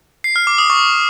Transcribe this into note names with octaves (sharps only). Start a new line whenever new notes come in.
C7
F6
D6
D#6
C#6